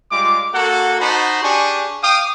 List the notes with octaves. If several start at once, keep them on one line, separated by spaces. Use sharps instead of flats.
G3 G#3 F4 D6
A#3 F#4 A4 F#5
D#4 F#4 C5 A5 B5
D4 G4 G#4 G#5 C#6
F5 G5 D6 D#6